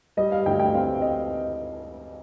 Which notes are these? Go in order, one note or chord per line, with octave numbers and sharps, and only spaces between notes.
G3 D#5
F5
D2 G5
G5
C4 F5
D#5